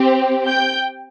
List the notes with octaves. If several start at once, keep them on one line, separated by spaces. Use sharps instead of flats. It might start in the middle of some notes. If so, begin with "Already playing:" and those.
Already playing: C4 G4
G5 G6